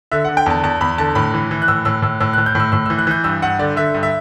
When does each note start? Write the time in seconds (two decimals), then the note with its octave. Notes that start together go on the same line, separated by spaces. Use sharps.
0.12 D3 E5
0.25 D3 F#5
0.37 G5
0.46 E2 A5
0.63 E2 A5
0.81 E2 B5
0.98 D3 A5
1.15 A2 B5
1.34 E3
1.51 E3
1.62 F#6
1.68 A2 E6
1.85 A2 E6
2.02 A2 E6
2.20 A2 E6
2.33 F#6
2.38 A2
2.46 G6
2.55 A2 E6
2.72 A2 E6
2.86 E6
2.90 E3
2.99 F#6
3.07 E3 G6
3.24 G2 E6
3.42 G2 F#5
3.59 D3 D5
3.76 D3 E5
3.94 G2
4.03 E5